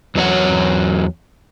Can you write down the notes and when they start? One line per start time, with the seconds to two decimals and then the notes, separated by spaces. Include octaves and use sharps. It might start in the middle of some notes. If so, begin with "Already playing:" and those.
0.15 E2 F#3 D#4 C#5 F#5